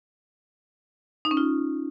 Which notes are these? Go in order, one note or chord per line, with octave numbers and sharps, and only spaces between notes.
D#4
C#4
F4